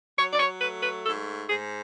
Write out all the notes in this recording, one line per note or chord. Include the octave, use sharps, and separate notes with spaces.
F#3 C#5
D5
C#5
A3 B4
B4
G#2 A4
G#2 G#4